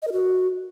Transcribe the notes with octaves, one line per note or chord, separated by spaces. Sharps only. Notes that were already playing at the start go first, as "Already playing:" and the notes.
D#5
A#4
F#4